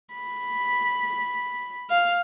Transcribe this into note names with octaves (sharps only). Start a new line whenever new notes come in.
B5
F5